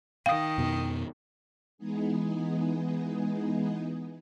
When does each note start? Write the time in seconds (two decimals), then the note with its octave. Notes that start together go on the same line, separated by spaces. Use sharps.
0.26 D#3 F5 G5 D#6
0.58 F2 B2 B3
1.78 E3 G#3 B3 D#4 G#4